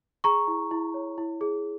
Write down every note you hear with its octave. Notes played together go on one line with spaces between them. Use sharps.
G#4 A#5 C#6
E4
E4
C#5
E4
G#4